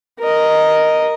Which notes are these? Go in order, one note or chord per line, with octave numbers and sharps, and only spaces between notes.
A#4 D#5